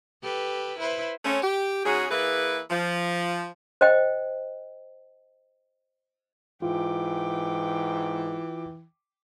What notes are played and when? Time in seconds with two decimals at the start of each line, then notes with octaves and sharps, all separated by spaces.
0.23 G4 A4 B4
0.79 E4 B4 C5
1.25 A3 C4 C#4
1.42 G4
1.85 G#2 C#4 F#4 G#4
2.10 E3 A#3 E4 G#4 B4
2.70 F3
3.81 C5 D#5 G5
6.62 G#2 E3 F4 G5 D6